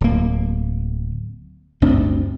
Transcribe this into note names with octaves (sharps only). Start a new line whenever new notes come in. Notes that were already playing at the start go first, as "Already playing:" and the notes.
D1 A#3
G1 D2 C4 D4